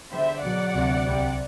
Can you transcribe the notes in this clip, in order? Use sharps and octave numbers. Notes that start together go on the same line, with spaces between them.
E2 D3 G3 C5 E5
E2 B2 F#3 D5 F#5
D2 C3 F#3
C2 C3 G3